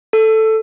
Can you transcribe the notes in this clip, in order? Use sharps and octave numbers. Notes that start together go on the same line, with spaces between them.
A4